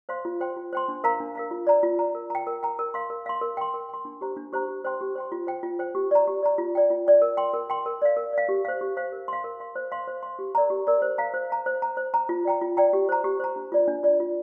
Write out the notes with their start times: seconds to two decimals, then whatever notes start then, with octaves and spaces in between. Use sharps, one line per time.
0.09 C5 F5 C6
0.25 F4
0.41 C5 G5 C6
0.57 F4
0.73 C5 G5 C6
0.88 D4
1.04 A#4 F5 A#5
1.20 D4
1.35 A#4 F5 A#5
1.51 F4
1.67 D5 A#5
1.83 F4
1.99 D5 A#5
2.15 A#4
2.30 G5 A#5
2.47 A#4
2.63 G5 A#5
2.79 A#4
2.94 F5 C6
3.10 A#4
3.26 F5 C6
3.41 A#4
3.57 G5 C6
3.74 A#4
3.89 G5 C6
4.05 D4
4.21 G4 C5 A#5
4.36 D4
4.52 G4 C5 A#5
4.68 G4
4.84 C5 G5 C6
5.01 G4
5.15 C5 G5 C6
5.32 F4
5.47 C5 G5
5.63 F4
5.79 C5 G5
5.95 G4
6.11 D5 A#5
6.28 G4
6.43 D5 A#5
6.58 F4
6.75 D5 G5
6.90 F4
7.07 D5 G5
7.22 A#4
7.37 G5 C6
7.53 A#4
7.70 G5 C6
7.86 A#4
8.02 D5 F5
8.17 A#4
8.33 D5 F5
8.49 G4
8.65 C5 F5
8.81 G4
8.97 C5 F5
9.12 A#4
9.28 F5 C6
9.44 A#4
9.60 F5 C6
9.75 C5
9.92 F5 C6
10.07 C5
10.23 F5 C6
10.39 G4
10.55 A#4 D5 A#5
10.70 G4
10.87 A#4 D5 A#5
11.02 C5
11.18 F5 A#5
11.34 C5
11.50 F5 A#5
11.66 C5
11.82 A#5
11.97 C5
12.14 A#5
12.29 F4
12.45 D5 G5 A#5
12.61 F4
12.77 D5 G5 A#5
12.93 G4
13.09 C5 A#5
13.24 G4
13.40 C5 A#5
13.56 D4
13.72 F4 D5
13.88 D4
14.03 F4 D5
14.20 F4